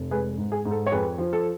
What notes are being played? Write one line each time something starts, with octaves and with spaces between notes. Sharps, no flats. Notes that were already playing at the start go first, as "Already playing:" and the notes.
Already playing: F1
G#3 G#4 B4
G#2
G#4
G#2
A4
C#5
F2 G#4 B4
F3
A4